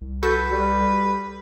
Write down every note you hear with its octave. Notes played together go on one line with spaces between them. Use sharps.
C2
F#4 A4 B4 G6
G3